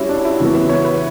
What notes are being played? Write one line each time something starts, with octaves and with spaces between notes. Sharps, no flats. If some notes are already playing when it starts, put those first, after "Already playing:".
Already playing: G3 C#4 E4 F#4 G4 C#5
D4
E4
C#3 E3 B3 F#4
E5
C#5
B4